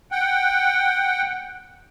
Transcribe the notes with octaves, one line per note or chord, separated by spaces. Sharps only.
F#5 G5